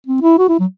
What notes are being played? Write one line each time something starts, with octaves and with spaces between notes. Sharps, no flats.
C4
E4
F#4
E4
F#3